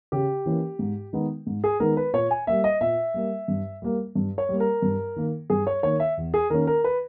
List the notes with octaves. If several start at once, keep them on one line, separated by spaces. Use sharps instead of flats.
C#3 G4
E3 A#3 C#4
G#2
D#3 G#3 B3 D#4
G#2
G#4
D#3 G#3 B3 D#4 A#4
B4
A#2 C#5
G#5
G3 A#3 E5
D#5
A#2 E5
G3 A#3
G2
G3 A#3
G2
C#5
G3 A#3
A#4
G2
D#3 A#3
G2 G#4
C#5
D#3 A#3 C#5
E5
E2
G#4
D#3 A#3 C#4 A#4
A#4
B4